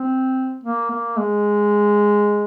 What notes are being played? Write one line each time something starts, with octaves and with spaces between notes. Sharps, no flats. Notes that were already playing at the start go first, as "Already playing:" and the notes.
Already playing: C4
A#3
A#3
G#3